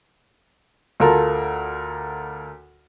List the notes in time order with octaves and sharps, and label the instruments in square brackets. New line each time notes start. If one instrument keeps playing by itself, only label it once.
[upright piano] D2 F4 A4 A#4